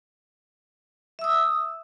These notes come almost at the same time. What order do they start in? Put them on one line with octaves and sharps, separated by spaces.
E5 E6 D#6